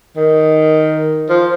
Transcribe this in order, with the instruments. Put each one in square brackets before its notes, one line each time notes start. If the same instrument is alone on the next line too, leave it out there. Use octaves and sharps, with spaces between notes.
[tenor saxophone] D#3
F3